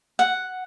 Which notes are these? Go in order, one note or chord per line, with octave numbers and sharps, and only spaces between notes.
F#5